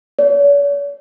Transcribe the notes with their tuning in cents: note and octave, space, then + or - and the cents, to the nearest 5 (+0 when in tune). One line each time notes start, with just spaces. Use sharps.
C#5 +45